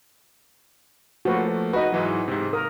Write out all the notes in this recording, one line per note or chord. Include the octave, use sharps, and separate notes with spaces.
F3 A3 A#3 F#4 B4
D#4 F#4 B4 D#5
G#2 E3 F#3
G#2 C3
A#4 D#6